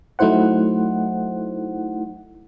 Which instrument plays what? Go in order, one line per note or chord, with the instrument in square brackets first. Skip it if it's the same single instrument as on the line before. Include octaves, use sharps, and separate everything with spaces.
[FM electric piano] F#3 A3 D#4 E4 C5 F#5